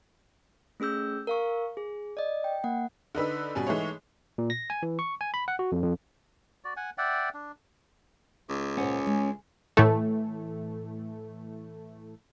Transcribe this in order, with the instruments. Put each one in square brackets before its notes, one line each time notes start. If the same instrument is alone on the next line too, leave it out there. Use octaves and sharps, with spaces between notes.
[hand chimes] A3 C#4 G#4 E6 G6
A#4 F5 C#6
G#4
D5 D#5
G5
A#3 F#5
[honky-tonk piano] D3 D#4 B4 E6
B2 G3 C#4
E3 G#3 A3 D#4 C#5
[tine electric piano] A#2
A#6
G#5
E3
C#6
G#5
B5
F#5
F#4
F2
F2
[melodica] F#4 D5
F#5 G#5
D5 E5 F#5 G5
D4
[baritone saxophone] C#2
[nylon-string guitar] A#2 C5 F#5 [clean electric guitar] C#4
[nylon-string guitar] G#3
[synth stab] A2 E3 A3